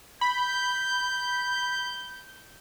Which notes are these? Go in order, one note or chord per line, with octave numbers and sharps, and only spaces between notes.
B5 G6